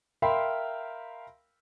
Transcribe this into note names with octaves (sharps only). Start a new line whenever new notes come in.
A#4 E5 F5 G5 B5 C6